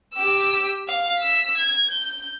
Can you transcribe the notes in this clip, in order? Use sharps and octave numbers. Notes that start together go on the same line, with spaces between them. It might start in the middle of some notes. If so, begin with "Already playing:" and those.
G4 E6
F5
E6 B6
G#6
G6